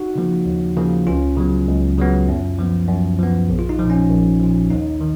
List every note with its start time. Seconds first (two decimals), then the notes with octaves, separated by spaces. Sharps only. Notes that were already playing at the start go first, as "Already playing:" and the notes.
Already playing: D#4 F#4
0.15 C#3 F3 A#3
0.46 D#2
0.77 C#3 F3 A#3
1.07 C#2 C#4 F4
1.36 C#3 F#3 B3
1.67 C#2
1.98 C#3 F#3 B3
2.28 F#2
2.58 F3 B3
2.88 F#2
3.19 F3 B3
3.49 A#1
3.59 F4
3.69 D#4
3.79 A#2 F3
3.90 C#4
4.09 A#1
4.40 A#2 F3
4.70 D#2 D#4
5.01 D#3